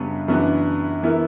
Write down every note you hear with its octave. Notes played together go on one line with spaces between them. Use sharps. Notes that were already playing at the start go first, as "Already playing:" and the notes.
Already playing: F#2 C#3 G3 B3 D4
F#2 E3 B3 D4
E3 B3 E4 A#4